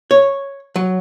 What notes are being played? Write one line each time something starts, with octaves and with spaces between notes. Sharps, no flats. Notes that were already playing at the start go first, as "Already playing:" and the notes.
C#5
F#3